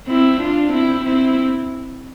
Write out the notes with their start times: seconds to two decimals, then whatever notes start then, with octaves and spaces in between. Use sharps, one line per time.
0.08 C4 E4
0.40 D4 F4
0.72 C4 E4
1.04 C4 E4